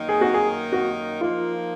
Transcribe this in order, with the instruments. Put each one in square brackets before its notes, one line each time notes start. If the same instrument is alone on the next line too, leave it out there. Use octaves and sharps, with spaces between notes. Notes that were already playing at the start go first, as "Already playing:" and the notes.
Already playing: [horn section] F#2 D#3 A#3 D#4
[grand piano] G#4
F#4
G#4
F#4
[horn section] F3 A#3 D#4 A#4 [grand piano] F4